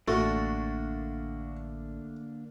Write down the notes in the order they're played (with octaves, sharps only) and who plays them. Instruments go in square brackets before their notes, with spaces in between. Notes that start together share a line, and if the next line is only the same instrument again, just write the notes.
[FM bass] A1 [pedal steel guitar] D3 A#3 D4 [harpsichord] A3 [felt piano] F#4